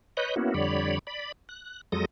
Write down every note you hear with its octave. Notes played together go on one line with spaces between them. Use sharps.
B4 C#5 D#5 F#6 G6
A#3 B3 C#4 E4 F#4
F2 D3 G3 C#5 D5 B5
D5 B5
F#6
F2 F#3 G#3 A4 D#6 A#6